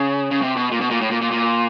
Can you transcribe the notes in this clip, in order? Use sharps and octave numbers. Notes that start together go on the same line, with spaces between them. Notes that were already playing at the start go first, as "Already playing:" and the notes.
Already playing: C#3
C#3
C3
B2
A#2
B2
A#2
A2
A#2
A#2
A#2